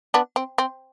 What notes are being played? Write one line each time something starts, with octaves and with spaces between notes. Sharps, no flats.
B3 D4
C4
C4